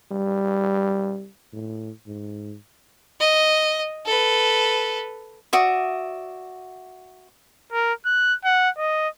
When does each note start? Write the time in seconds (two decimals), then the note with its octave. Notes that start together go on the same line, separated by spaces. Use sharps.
0.12 G3
1.53 A2
2.07 G#2
3.20 D#5
4.06 A4 B4
5.53 F#4 D5 E5 D#6
7.73 A#4
8.05 F#6
8.45 F#5
8.78 D#5